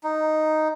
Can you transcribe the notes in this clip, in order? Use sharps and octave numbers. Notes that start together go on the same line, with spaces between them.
D#4